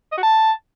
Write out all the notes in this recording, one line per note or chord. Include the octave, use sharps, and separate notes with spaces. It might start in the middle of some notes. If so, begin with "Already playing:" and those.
D#5
F#4
A5